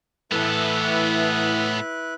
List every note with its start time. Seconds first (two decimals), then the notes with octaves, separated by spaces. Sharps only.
0.32 A2 E3 A3 B3 E4 A4 B4 F#6